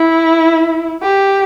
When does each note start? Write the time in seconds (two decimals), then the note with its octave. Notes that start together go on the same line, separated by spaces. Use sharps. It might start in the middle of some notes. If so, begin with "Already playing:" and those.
Already playing: E4
1.03 G4